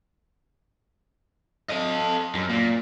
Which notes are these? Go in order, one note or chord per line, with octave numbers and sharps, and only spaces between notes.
A4 D#5
F#2
A#2